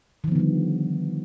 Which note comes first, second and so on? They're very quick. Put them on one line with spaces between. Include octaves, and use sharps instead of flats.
D#3 F3 B3 D3 G3